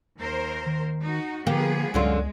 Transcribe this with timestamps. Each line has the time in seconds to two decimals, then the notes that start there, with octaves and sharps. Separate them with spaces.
0.21 D#2 A#4 C5
0.66 D#3
1.03 D#4 F#4
1.47 D3 F3 A#3 B3 G4 G#4
1.94 C#2 F#2 D3 G#3 F4